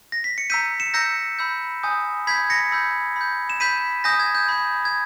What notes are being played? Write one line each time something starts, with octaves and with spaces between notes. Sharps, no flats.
A#6
B6
C#7
A#5 E6 G6 B6 D#7
C#7 E7
A#5 E6 G6 A#6 C#7
B5 E6 G6
G#5 D#6 G6
B5 G6 G#6 B6
A#6 C#7
B5 E6 G6
B5 G6
E7
B5 G6 B6 D#7
G#5 D#6 G6 A#6
G#6
G6
B5 G6
G#6